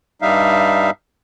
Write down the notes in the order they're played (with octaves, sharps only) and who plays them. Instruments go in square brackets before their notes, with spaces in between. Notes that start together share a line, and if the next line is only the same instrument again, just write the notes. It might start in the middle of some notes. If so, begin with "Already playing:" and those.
[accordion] G2 G3 D#4 E5 F5